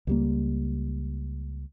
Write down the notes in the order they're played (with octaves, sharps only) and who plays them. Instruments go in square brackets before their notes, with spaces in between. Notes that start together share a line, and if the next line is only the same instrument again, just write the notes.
[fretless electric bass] C#2 G3 A#3